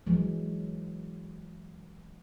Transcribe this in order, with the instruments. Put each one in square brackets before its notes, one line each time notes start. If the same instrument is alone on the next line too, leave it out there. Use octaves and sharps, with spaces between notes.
[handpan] E3 F#3 G#3